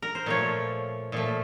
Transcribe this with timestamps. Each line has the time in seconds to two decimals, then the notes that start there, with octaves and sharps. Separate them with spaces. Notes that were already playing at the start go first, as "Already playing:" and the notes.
0.02 A#4
0.15 C5
0.26 A#2 F3 A3 C#5
1.12 A#2 F3 A3